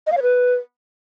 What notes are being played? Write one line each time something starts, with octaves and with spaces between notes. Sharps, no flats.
D#5
F5
C#5
B4